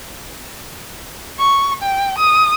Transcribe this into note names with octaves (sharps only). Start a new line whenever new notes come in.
C#6
G5
D#6